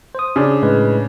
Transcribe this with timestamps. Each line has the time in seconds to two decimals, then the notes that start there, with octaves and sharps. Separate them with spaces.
0.15 C5 D#6
0.36 C#3 D4
0.62 A2 G#3 B4